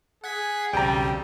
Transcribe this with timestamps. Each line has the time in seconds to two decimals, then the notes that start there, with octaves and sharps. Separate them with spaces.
0.24 G#4 F#5 G#6 B6
0.73 B1 E2 C#3 G3 C4 G5 A#5